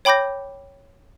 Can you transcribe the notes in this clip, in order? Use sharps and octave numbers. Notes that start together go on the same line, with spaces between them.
C#5 G5 B5 D6 G6 A#6